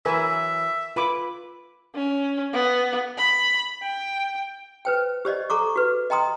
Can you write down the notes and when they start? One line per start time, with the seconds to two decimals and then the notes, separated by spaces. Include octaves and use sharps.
0.06 E3 F#3 A#4 B4 E5 G#5
0.96 F4 B4 B5 D6
1.95 C#4
2.53 B3
3.18 B5
3.83 G5
4.85 B4 C5 G5
5.25 G4 C5 D5 D#5
5.50 A4 A#5 C#6 D6
5.76 F#4 B4
6.10 D#5 G5 A#5 C6 D#6